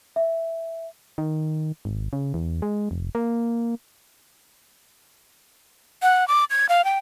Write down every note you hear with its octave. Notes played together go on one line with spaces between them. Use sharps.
E5
D#3
G#1
C#3
E2
G#3
F1
A#3
F#5
D6
G#6
F5
G5